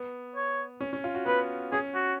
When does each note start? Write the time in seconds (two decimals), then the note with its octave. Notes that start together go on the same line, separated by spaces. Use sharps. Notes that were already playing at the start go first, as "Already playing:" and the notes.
Already playing: B3
0.36 C#5
0.80 C#4
0.93 C#4
1.04 F4
1.15 F#4
1.26 B3 B4
1.72 C#4 G#4
1.95 F#4